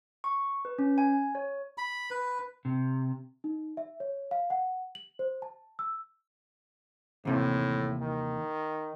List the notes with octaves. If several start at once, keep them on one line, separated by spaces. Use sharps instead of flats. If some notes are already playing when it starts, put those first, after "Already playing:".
C#6
B4
C#4
G#5
C#5
B5
B4
C3
D#4
E5
C#5
F5
F#5
F#7
C5
A5
E6
D#2 A2 C3 E3
D#3